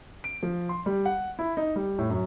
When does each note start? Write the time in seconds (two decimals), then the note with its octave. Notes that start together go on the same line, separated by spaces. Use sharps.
0.24 D7
0.43 F3
0.69 C6
0.86 G3
1.05 F#5
1.39 E4
1.57 D#4
1.76 G3
1.99 A2
2.10 F#2